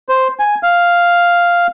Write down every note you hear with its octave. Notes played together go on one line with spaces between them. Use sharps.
C5
G#5
F5